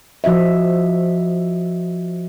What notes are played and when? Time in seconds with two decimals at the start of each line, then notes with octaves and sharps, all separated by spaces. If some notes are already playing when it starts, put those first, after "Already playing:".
0.24 F3 F#4 D#5 E5